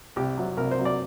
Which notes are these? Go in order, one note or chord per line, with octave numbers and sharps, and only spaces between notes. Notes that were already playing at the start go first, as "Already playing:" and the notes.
C2 G4
C3 F#3
C2 A#4
C5
C3 F#3
D5